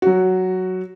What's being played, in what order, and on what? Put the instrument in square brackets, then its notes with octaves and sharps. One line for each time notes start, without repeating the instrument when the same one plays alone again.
[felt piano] F#3 F#4